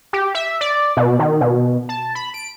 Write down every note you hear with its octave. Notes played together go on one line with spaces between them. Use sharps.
G4
E5
D5
B2
D#3
B2
A5
B5
D7